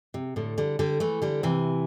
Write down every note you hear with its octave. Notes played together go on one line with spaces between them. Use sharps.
C3
A2 D3
D3 G3
D3 G3
E3 A3
D3 G3
C3 E3